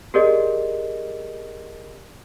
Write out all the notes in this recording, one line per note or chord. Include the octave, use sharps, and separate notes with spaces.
G4 G#4 A#4 D5 D#5